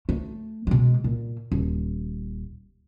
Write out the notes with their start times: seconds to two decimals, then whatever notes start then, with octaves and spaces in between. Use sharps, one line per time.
0.09 A3
0.67 B2 G#3
1.04 A#2
1.52 D#1